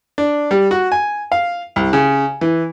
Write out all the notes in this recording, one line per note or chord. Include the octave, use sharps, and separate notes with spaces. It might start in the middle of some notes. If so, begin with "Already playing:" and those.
D4
G3
F#4
G#5
F5
C2
C#3
E3